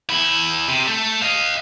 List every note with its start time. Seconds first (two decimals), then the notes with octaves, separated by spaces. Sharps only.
0.10 E2 E4
0.68 C3
0.87 A3 A4
1.22 D#5 F5